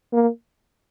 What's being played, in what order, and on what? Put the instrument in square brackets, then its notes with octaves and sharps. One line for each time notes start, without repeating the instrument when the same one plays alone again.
[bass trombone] A#3